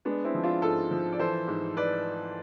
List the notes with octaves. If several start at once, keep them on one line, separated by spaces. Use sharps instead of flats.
G#3 B3 D4
C4 E4
F3
D4 F4
G#2 F4 A4
F3
D5
E3 A4 C5
G#2
B4 D5